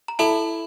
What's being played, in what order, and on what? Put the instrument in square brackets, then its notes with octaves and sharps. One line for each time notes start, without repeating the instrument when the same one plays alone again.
[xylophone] A#5
[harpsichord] E4 [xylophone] A4 A5